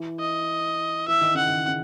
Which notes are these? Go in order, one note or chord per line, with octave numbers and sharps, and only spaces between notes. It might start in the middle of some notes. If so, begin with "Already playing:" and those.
Already playing: E3
D#5
E3 E5
D#3
C#3 F#5
D#3
C#3